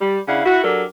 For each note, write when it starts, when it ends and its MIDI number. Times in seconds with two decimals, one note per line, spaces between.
0.01 0.19 55
0.27 0.42 49
0.27 0.42 62
0.27 0.42 64
0.27 0.42 77
0.27 0.42 78
0.45 0.63 64
0.45 0.63 66
0.64 0.84 54
0.64 0.84 62
0.64 0.84 67
0.64 0.84 69
0.64 0.84 70